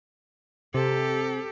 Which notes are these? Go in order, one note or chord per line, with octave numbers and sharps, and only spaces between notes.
C3 G4 A4